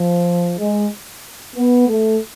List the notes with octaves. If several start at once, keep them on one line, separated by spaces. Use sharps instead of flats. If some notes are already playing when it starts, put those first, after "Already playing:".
Already playing: F3
G#3
B3
A3